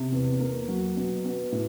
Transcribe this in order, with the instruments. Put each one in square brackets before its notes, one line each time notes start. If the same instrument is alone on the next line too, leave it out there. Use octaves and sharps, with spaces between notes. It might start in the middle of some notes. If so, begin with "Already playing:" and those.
Already playing: [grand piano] C3
E2
A#3
F#3
B2
B2
A2